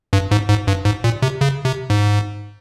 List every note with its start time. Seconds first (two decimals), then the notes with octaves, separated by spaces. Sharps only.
0.13 G2
0.31 G#2
0.49 G#2
0.67 G2
0.85 G#2
1.04 A#2
1.22 C3
1.41 C#3
1.65 C3
1.90 G#2